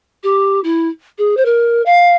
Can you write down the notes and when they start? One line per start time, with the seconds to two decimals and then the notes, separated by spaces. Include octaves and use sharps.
0.23 G4
0.64 E4
1.18 G#4
1.37 C5
1.45 A#4
1.86 F5